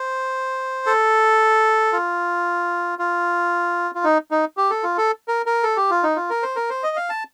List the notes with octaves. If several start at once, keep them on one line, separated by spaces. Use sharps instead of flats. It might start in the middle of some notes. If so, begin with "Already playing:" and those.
Already playing: C5
A4
F4
F4
F4
D#4
D#4
G4
A4
F4
A4
A#4
A#4
A4
G4
F4
D#4
F4
A#4
C5
A#4
C5
D#5
F5
A5